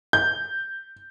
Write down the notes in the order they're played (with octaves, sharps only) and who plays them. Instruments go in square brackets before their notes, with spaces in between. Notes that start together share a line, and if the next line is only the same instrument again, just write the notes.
[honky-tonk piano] G6